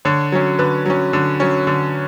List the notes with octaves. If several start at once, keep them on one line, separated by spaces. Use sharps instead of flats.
D3 C#5
F#3 C#4
D3 B4
F#3 C#4
D3
F#3 C#4
D3